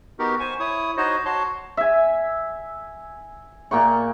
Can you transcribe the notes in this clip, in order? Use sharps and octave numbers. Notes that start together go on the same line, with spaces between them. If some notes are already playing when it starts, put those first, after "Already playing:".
B3 D#4 F#4 G4 A#4
C5 G#5 C#6
E4 C#5 D#6
D#4 F#4 C5 C#5 D#5
F#4 C#5 A5 C6
E5 G#5
A#2 A#3 G5 C#6